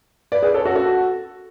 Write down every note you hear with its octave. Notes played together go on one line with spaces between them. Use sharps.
B4 D5
G#4 B4
A4 C#5
F#4 A4
F#4 A4